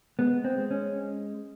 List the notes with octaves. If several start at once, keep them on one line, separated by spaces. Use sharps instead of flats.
G#3 B3
C4
G#3
C#4